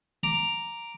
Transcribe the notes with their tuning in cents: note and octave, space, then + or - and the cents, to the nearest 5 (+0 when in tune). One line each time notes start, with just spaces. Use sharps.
A#5 +0 D6 +0